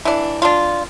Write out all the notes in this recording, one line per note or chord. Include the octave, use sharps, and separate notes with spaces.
E3 D4
D4 F4